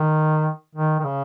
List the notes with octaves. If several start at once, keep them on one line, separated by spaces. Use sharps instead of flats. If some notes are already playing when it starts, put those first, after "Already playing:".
Already playing: D#3
D#3
D#3
C#3